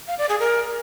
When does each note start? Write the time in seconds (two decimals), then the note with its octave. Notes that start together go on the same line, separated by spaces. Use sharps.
0.08 F5
0.18 D5
0.29 G#4
0.40 A#4